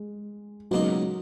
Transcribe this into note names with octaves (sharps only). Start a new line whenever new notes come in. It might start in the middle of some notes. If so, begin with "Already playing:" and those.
Already playing: G#3
C#2 B2 F#3 A#3 D#4